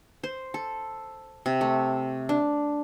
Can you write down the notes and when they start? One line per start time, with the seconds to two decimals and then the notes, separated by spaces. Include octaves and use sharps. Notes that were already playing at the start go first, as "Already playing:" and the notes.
0.24 C5
0.54 A4
1.46 C3
1.61 A3
2.29 D4